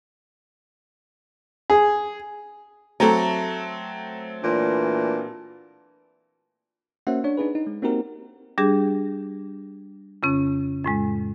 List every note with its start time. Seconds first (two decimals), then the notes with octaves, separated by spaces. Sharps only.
1.70 G#4
3.00 F#3 A3 C4 A4 A#5
4.43 A#2 E3 D4
7.07 A#3 C#4 F#4 C5 E5 F#5
7.24 D4 C#5
7.37 D4 D#4 G#4 B4
7.55 D#4
7.67 G#3
7.82 A#3 C4 D#4 F#4 G4 A#4
8.58 G3 D4 G4 G#4
10.23 F2 C#3 C#4
10.84 F2 A2 G#3